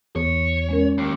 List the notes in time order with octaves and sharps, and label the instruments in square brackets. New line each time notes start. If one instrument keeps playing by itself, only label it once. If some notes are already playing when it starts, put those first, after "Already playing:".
[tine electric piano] E2 [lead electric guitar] C#5
[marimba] G#3 C#4 A#4
[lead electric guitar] D#2